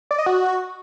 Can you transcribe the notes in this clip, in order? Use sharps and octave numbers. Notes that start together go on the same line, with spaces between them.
D5
D#5
F#4